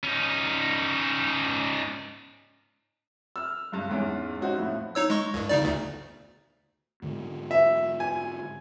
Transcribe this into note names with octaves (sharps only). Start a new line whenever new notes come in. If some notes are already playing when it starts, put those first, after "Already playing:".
C#4 D#4
E6 F6
C#2 G2
E2 G#2 C#4
C#4 D#4 F#4 C5
F2 A2
D#4 C#5 E6
G#3 C#6
C2 G2
C#3 D#4 D5
G1 D2
G#2 D3 G#3
E5
G#5